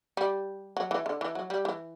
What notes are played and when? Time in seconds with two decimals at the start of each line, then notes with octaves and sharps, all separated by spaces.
0.17 G3
0.77 F#3
0.91 E3
1.06 D3
1.21 E3
1.35 F#3
1.50 G3
1.65 E3